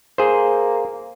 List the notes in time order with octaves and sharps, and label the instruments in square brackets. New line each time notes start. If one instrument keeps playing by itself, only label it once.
[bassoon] A#3 [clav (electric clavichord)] G#4 C5